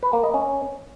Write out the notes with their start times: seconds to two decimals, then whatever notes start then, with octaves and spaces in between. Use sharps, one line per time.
0.03 B4
0.13 A#3
0.24 D#5
0.34 C#4